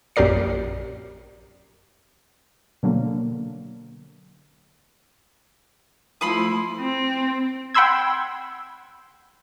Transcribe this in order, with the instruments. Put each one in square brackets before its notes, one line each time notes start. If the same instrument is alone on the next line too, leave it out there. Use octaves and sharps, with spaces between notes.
[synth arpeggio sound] A#1 F#2 G4 A#4 D5 C7
B2 D3 F#3 A#3
[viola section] F3 A3 E4 [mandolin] B5 C6 D#6
[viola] C4
[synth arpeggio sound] F#5 G5 B5 C6 E6 G#6